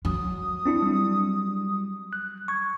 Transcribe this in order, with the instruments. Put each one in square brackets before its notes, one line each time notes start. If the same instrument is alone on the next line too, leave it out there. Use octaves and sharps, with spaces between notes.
[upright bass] F#3 [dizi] D#6
[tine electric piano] C4 D4 E4
G3
F#6
C#6 G#6